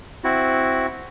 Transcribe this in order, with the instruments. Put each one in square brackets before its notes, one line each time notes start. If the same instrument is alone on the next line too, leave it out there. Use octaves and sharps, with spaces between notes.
[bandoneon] C4 E4 F#4